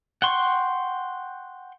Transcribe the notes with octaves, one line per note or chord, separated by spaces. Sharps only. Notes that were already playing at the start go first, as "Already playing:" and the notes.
F#5 G5 C6 C#6